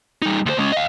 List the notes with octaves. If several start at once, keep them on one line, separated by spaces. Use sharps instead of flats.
G3 D#4
D2 C5
G#3 C#4
D#5 F5